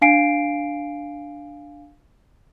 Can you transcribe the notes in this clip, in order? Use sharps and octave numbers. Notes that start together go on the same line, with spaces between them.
D4 F5 G#5 C7 D7